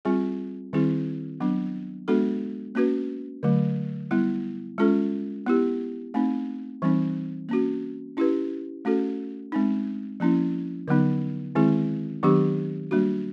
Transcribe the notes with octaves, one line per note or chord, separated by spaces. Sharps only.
G3 C4 F4 G#4
D#3 G3 C4 E4 G#4
F#3 B3 D4
G#3 B3 D4 F#4 A4
A#3 C#4 F#4 B4
D3 F#3 A3
G3 B3 E4
G#3 C#4 F4 A4
B3 E4 G4
A3 C4 D#4
E3 G3 C4 D#4
A#3 C#4 F#4
C#4 E4 G4 B4
A3 C#4 F#4 A4
G#3 C4 D#4
F3 A#3 C#4 E4
D3 F#3 B3 D#4
D#3 G#3 C4 E4 G#4
D#3 F#3 B3 D4 G4
G3 A#3 D4 F#4